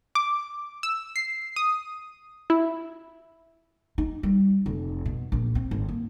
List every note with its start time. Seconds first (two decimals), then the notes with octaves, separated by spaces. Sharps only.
0.15 D6
0.83 E6
1.16 C7
1.56 D#6
2.50 E4
3.98 D#4
4.23 G3
4.66 F1
5.05 B2
5.32 A#1
5.55 C4
5.71 G#1
5.89 A#3